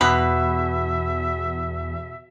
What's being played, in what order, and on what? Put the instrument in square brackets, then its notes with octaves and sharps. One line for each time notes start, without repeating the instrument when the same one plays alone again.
[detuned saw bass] E2 [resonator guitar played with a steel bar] B2 [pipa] B4 [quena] E5